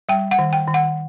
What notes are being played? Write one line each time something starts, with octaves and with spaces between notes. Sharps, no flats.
G3 G5
F#5
D#3
G5
D#3
F#5